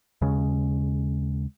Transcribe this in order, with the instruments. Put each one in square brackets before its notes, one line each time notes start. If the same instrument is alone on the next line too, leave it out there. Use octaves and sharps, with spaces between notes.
[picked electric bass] D#2 C#3 G#3 C#4